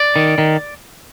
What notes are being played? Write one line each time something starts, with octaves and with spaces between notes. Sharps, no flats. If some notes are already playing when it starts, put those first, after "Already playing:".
Already playing: D5
D#3
D#3